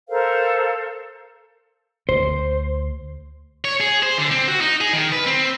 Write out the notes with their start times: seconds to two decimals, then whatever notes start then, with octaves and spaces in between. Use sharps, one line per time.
0.09 A4 A#4 C5 F5
2.09 D2 C5
3.65 C#5
3.80 G#4
4.03 C5
4.18 D3
4.31 C4
4.48 F#4
4.61 D#4
4.81 G#4
4.93 D#3
5.12 B4
5.26 C4